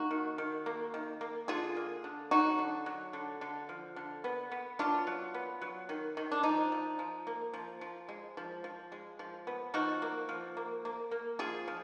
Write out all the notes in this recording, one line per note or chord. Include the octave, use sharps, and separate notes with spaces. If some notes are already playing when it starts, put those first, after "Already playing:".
Already playing: A#3 D#4 F#4
D#3
D#3
A#3
D#3
A#3
D3 F4 G#4
A#3
D3
F#3 D#4 F#4
D3
F#3
D3
D3
F3
D3
B3
B3
F#3 D4 F4
F#3
B3
F#3
D#3
D#3
D4
F3 D#4
F3
F3
A#3
F3
F3
G#3
F3
F3
G#3
F3
B3
F3 D#4 F#4
A#3
F3
A#3
A#3
A#3
F3 F4 G#4
F3